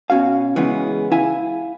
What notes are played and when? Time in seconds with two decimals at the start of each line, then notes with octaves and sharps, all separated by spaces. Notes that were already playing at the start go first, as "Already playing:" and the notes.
0.10 B2 C#4 F#4 F5
0.56 C#3 E3 G#3 B3
1.12 E4 F5 G#5